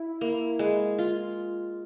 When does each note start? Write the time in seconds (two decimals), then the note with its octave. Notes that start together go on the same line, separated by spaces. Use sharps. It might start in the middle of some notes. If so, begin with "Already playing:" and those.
Already playing: E4
0.21 A#3
0.59 G#3
0.98 F4